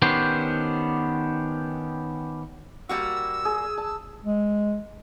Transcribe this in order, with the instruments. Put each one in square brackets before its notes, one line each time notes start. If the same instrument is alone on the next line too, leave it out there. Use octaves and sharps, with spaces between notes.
[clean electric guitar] D#3 B3 C#4 D4 G4 C5
[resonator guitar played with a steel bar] G3 A#3 F#4 [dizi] E6
[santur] G#4
A5
[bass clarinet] G#3